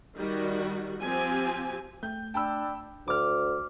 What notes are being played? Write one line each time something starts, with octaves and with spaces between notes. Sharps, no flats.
D#3 G3 F#4
F3 C4 G4 G#5
A3 G5 G6
D4 G5 A5 B5 E6
D2 D6 F6